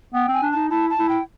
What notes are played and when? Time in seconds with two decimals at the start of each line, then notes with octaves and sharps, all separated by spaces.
0.14 B3 G5
0.28 C4
0.33 G#5
0.42 D4
0.52 D#4 A5
0.70 E4 A5
0.90 A5
0.99 E4
1.09 G5